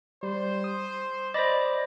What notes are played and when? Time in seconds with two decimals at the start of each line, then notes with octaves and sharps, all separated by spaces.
0.23 G3 C5
0.64 D#6
1.34 C5 D5 D#5 B5 A#6